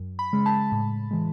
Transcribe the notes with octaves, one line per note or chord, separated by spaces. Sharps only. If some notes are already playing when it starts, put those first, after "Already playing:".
Already playing: F#2
B5
C#3 G#3
A5
A2
E3 G#3